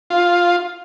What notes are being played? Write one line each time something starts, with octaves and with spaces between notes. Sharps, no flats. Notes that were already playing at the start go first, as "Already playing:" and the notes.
F4